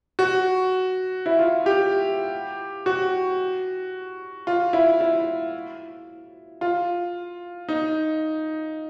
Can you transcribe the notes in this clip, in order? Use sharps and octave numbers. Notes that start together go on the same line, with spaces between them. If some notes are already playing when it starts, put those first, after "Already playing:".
F#4
E4
F4
G4
F#4
F4
E4
E4
F4
D#4